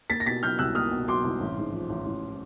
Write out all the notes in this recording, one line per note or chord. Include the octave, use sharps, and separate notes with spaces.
A#3 A6 B6
A#6
B2 A6 B6
F#3 F6 G6
C2 E6 F#6
A#3 D#6 F6
B2
F#3 C6 D6
C2
A1
G#2
F3
A1
A1